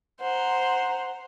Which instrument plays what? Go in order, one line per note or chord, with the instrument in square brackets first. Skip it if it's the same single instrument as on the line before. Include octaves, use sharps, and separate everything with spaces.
[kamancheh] C5 A#5 [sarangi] F#5